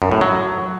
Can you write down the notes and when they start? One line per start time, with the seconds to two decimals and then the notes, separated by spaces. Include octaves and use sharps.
0.02 F#2
0.11 A2
0.21 F#3